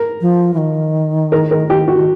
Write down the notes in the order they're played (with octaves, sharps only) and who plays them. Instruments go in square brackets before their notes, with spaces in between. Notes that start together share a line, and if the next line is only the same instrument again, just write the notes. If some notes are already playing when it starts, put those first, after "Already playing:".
Already playing: [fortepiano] A#4
[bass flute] F3
E3
D#3
[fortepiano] A#4
A#4
G4
F#4
[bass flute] D#3